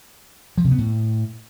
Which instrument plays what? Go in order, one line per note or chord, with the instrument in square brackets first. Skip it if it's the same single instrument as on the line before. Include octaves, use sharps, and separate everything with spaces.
[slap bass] F3
C3
B3
A2